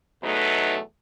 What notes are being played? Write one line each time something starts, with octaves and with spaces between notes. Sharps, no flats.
E2 B2 F#3 A3 D#4 B4